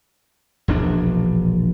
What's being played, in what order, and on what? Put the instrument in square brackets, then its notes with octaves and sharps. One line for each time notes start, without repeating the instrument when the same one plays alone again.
[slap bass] E1 A#1 D4